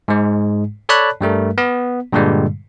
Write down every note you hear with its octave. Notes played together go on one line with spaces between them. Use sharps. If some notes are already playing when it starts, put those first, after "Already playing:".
G#2 G#3
A4 C#5 D5 A5 B5 F#6
G2 G3 A3 A#4
B3
G2 A#2 D3 G3 G#3